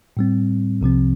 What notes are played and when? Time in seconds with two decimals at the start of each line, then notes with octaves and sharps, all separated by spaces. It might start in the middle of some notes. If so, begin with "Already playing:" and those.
0.17 A2 G3 C4
0.81 C2 C3 F3 C4